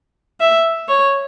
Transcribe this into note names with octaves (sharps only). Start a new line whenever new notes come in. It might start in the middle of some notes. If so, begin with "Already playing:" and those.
E5
C#5